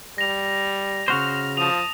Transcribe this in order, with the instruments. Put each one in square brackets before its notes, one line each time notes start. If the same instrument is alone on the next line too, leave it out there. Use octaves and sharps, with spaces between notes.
[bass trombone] G3 [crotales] A#6 F7
[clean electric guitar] C#3 F#4 C5 [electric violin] F6
[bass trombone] F3 [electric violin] A5 D#6 [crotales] F7